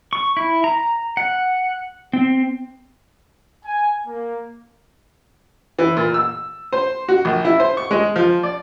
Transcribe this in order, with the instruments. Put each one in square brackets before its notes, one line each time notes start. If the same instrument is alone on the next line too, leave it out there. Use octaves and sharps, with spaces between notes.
[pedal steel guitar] C#6
E4
A#5
F#5
C4
[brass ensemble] G#5
A#3
[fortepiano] E3
A#2
E6
C5
F#4
A#1
E4
C5
C#6
G#3
F3
D5